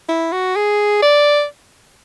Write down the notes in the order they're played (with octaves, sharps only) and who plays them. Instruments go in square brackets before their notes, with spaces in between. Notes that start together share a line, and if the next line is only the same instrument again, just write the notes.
[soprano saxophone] E4
F#4
G#4
D5